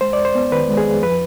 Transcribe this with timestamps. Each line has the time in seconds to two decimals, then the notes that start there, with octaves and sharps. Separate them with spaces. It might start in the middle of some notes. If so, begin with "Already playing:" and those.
0.01 G#3 C5
0.13 D5
0.18 F2
0.25 C5
0.35 B3
0.52 D#3 B4
0.69 G#3
0.77 G#4
0.85 F2
1.03 F3 B4